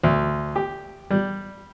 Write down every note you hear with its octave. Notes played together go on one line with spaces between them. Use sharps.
D2
G4
G3